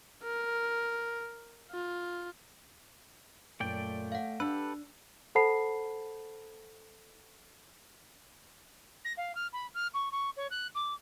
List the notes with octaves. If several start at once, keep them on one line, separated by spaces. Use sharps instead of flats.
A#4
F4
F#2 A#2 A3 D5 G5
F5 F#5
D4 G4 A4 B4 E6
A4 C5 F#5 A5 B5 C7
A#6
F5
F6
B5
F6
C#6
C#6
C#5
F#6
D6